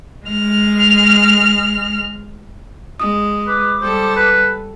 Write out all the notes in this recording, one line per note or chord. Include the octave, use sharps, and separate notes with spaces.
G#3 F6
G#3 D#6
B4 D6
G3 A4 C5
B4